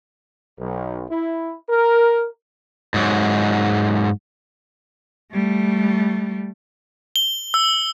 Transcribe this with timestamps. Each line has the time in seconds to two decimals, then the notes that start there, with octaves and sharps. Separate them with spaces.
0.58 B1
1.10 E4
1.69 A#4
2.94 G#2 F#3
5.32 G3 A3
7.16 G7
7.54 E6